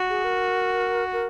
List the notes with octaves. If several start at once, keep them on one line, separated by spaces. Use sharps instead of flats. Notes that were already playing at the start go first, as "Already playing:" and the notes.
Already playing: F#4
G#4
A#4
A#4